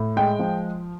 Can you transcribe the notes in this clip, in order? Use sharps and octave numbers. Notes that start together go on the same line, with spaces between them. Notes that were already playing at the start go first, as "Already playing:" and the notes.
Already playing: A2
G#3 G5
F3